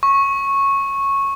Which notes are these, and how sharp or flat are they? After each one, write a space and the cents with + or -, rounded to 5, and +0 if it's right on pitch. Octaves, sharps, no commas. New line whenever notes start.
C#6 -10